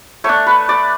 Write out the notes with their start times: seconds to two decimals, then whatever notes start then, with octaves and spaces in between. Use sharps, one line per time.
0.24 A3 D4 C#5
0.47 B4
0.69 D5